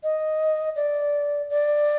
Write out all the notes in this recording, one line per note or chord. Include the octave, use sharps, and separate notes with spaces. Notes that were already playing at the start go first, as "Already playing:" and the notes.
D#5
D5
D5